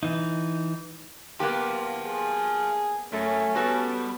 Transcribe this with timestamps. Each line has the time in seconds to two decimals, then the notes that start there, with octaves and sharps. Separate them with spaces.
0.03 E3 D#4
1.40 A#3 B3 G4 F5 A5
2.04 G#4
3.13 F#2 A3 C#4
3.55 G3 B3 F#4 A4